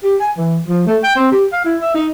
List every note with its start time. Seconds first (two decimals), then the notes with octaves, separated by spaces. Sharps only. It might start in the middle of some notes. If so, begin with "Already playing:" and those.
0.03 G4
0.20 G#5
0.37 E3
0.67 F3
0.87 A3
1.03 G5
1.16 C4
1.31 G4
1.52 F5
1.65 E4
1.81 E5
1.95 D#4